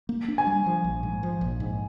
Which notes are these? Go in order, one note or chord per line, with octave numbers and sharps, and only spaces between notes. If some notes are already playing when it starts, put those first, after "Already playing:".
A#3
D4
G#5
G3
F3
A#1
G#2
F3
A#1
G#2